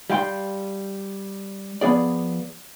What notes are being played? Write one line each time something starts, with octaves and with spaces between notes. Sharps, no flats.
G3 F5 G5 C6
F3 B3 G#4 D5